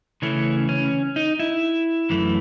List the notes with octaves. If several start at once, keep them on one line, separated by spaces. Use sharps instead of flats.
C#3 E3 A3 C#4
C#4
D#4
E4
F#2 E3 A3